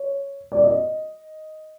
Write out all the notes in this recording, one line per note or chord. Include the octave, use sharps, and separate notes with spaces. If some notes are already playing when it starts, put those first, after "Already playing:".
Already playing: C#5
D5
D#5